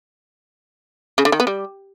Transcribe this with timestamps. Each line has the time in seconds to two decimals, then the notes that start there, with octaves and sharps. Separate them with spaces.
1.18 C#3
1.25 D3
1.32 D#3
1.40 B3
1.47 G3